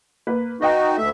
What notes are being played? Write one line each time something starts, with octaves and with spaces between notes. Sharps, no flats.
A#3 B4
D#4 F#4 B4 D#5 G5
D2 A3 E5